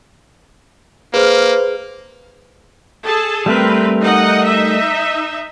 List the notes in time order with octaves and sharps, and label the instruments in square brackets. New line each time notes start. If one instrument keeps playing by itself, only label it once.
[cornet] A#3 [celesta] G#4 F6 [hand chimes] B4 C5
[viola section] G#4 A4 A5
[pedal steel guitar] G3 A3 A#4 [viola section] C4 B4
[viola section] D#4 D#5 F#5
D#4 D#5 E5